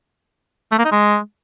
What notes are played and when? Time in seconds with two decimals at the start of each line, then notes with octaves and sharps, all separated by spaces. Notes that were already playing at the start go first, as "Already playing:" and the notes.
0.72 A3
0.78 A#3
0.85 D#4
0.92 G#3